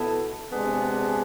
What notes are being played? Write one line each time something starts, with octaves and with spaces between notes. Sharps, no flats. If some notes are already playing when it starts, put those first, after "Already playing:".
Already playing: B2 B3 E4 A4
C3 G#3 B3 D4 G#4